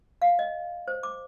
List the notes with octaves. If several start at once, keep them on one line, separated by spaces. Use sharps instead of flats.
F5
D#5
C5
D6